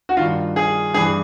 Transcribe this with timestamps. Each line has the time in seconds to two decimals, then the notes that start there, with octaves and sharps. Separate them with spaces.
0.09 F#4
0.17 G2 D#3 F4
0.56 G#4
0.94 G2 G#4
0.98 E3